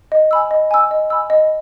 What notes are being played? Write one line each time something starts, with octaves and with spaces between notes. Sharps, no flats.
D#5
G#5 B5 E6
D#5
G#5 B5 E6
D#5
G#5 B5 E6
D#5